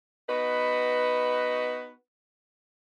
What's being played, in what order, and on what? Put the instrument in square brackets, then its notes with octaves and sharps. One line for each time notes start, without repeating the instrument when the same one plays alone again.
[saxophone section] B3 D#4 F#4 B4